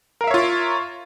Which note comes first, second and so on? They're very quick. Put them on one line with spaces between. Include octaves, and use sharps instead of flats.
A#4 F5 E5 C#5 F4